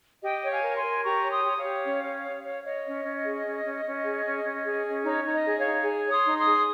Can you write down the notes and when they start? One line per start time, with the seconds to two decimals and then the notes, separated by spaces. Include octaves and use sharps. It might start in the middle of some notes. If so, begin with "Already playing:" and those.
0.22 G4 D#5 G5
0.43 C#5
0.49 F5 G#5
0.63 A#4
0.76 G#5 C6
0.83 A#4
1.03 G4 A#5 C#6
1.23 C#5
1.30 C6 D#6
1.44 G4
1.57 C#5 F5
1.63 G4
1.84 C#4
2.04 C#5
2.24 C#5
2.44 C#5
2.64 C#5 D#5
2.85 C#4
3.04 C#4
3.25 G#4
3.45 C#4
3.64 C#4
3.84 C#4
4.04 G#4
4.24 C#4
4.44 C#4
4.65 G#4
4.86 C#4
5.05 D#4 C#5
5.25 D#4
5.32 D#5
5.45 G#4
5.58 C#5 F5
5.66 D#4
5.85 G#4
6.06 C#5
6.12 C6 D#6
6.26 D#4
6.39 C6 D#6
6.46 G#4